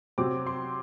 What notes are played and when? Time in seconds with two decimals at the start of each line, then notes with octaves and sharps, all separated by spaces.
0.18 C3 F#3 C4 D6
0.47 C6